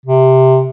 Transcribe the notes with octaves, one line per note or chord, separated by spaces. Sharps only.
C3